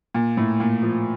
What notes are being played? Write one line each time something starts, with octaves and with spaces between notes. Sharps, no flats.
A#2
A2
A#2
F3